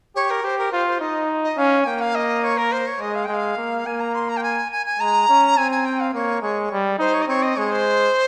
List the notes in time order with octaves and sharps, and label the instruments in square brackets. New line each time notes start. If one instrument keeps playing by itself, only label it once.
[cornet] G4 [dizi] C#5
[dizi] A#4
[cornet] G4 [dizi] C5
[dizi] A#4
[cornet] F4 [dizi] C5
[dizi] C5
[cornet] D#4 [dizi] D#5
[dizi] D#5
[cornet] C#4 [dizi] F5
[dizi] G#5
[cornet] A#3 [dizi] G5
[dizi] F5
D#5
C#5
A#4
C5
C#5
[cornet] G#3 [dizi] D#5
[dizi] F5
[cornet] G#3 [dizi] G5
[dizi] F5
[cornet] A#3
[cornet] A#3 [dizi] G#5
[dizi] A#5
C6
A#5
G5
G#5
G#5
G#5
[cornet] G#3 [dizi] A#5
[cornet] C#4
[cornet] C4 [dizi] G#5
[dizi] G#5
G5
F5
[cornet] A#3 [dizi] C#5
[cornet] G#3 [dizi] C#5
[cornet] G3
[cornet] D#4 [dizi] C5
[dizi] C#5
D#5
[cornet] C4 [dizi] C#5
[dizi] D#5
[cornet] G#3 [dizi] C#5
[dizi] C5